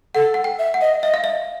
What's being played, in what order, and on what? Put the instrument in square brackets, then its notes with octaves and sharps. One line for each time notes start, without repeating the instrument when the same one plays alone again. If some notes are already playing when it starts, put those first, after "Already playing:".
[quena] A4 [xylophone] F#5
[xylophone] F#5
G5
[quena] E5
[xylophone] F#5
[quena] D#5
[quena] D#5 [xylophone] E5
[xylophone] F5
E5